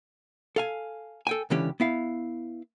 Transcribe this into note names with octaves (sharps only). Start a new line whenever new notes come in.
A4 F5 G#5
A4 G5 G#5
C#2 D3 E3 C#4 G4
B3 E4 F5